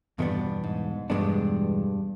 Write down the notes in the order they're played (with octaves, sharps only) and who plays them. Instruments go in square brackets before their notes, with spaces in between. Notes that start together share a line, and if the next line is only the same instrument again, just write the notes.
[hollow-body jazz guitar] E2 B2 G#3 B3 D4 [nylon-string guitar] G2
[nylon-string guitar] G#2
[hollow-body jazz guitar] E2 B2 G#3 B3 D4 [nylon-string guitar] G2